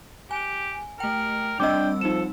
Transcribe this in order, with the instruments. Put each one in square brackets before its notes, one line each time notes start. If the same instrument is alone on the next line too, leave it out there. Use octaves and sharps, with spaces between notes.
[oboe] G4 [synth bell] G#5
[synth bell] A3 G5 [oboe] A#4
[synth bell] G3 C4 E6 [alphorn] D4 [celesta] D#5 D6 [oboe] G5
[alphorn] F3 [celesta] D#4 E7 [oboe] A4